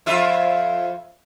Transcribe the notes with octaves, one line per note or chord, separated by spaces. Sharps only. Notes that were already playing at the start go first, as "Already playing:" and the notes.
F2 F4 E5